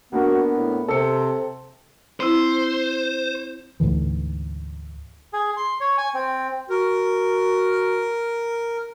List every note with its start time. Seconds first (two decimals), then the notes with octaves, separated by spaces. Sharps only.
0.13 A#3 B3 D4 F#4 A#4
0.56 A2
0.89 C3 C4 A4 E6 C#7
2.20 C4 E4 C5
3.80 D2 G#2 D3 E3
5.33 G#4
5.57 C6
5.81 C#5
5.98 G#5
6.14 C4
6.70 F#4 A#4